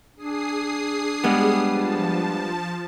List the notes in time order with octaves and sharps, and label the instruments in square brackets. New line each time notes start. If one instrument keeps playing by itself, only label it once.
[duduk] D4 [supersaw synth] G#4 D#6 C7
[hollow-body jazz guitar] G3 G#3 B3
[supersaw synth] F3 A5